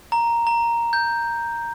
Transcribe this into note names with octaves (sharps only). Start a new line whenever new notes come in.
A#5
A#5
G6